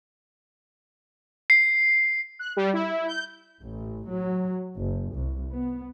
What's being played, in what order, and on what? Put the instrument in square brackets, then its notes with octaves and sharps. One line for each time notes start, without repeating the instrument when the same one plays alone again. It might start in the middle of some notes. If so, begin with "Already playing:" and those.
[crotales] C7
[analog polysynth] F#6
G3
E4
G6
[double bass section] A1
F#3
F#1
C2
B3